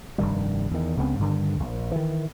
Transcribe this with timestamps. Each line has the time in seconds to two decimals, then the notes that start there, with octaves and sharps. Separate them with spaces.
0.18 F1 G2 D#3 G3
0.71 E2 D#3
0.97 C#2 C#3 B3 C4
1.19 G2 D3 D#3
1.60 A#1
1.92 D#3 E3